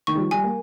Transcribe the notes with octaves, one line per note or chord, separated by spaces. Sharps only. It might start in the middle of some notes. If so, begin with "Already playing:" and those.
D#3 C#6
G3
F3
G3 G#5
A#3